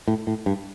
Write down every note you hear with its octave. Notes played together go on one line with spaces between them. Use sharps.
A2
A2
G2